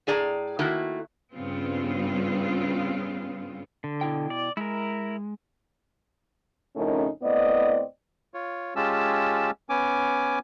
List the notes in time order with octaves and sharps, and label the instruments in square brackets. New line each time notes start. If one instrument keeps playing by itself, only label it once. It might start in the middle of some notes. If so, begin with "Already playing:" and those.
[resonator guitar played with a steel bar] A2 G#4 D5 A#5
D#3 A3 A#3 E4 F#4
[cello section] G2 C#3 B3 C4 F4
[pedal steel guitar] D3
[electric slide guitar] B2 E4 G5
[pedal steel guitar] D5
[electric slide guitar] G#3 [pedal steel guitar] E4 A#4
[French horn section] F2 A2 C#3 C#4 D#4 A#4
A2 B3 C4 D5 D#5
[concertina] F4 C#5
G#3 C#4 F4 G4 A5 E6
B3 C#4 G#5 D6